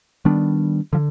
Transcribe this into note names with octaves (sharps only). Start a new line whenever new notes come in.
D#3 G3 B3 D4
D3 F3